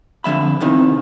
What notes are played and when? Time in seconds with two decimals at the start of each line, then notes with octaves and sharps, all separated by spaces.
0.24 F2 D3 F#3 E5 B5
0.60 E2 C3 D#3 E3